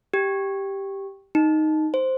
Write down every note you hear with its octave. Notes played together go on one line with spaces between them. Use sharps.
G4
D#4
C5